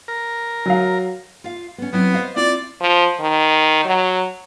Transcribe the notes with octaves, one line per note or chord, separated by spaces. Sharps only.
A#4
F#3 F5
F4 F5
B3 C#4
F#3 B3 C4 E4
C5 D#5 F5
C4 E4 F4 D5
F3
D#3
F#3